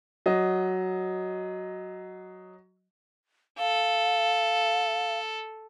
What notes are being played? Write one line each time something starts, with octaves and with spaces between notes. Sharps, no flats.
F#3 D#5
A4 F5